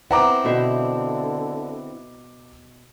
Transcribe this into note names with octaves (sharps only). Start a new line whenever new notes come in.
B3 C4 E4 F#5 A#5 D6
B2 D3 C5 E5